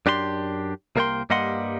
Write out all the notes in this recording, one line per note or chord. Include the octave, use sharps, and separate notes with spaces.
F#2 D4 G4 B4 C6
C2 A#3 A#4 C#5 G5 C6
G2 G3 A#3 D#5 F#5 C6